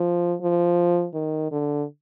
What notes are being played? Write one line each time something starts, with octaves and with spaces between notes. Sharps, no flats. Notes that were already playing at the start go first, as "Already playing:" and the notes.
Already playing: F3
F3
D#3
D3